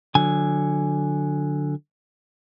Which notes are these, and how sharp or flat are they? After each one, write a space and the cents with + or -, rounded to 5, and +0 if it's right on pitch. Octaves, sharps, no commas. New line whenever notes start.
D3 +5 F#3 -30 G#5 +0